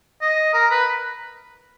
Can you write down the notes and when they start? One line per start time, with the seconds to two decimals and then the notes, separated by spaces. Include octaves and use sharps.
0.22 D#5
0.54 A#4
0.71 B4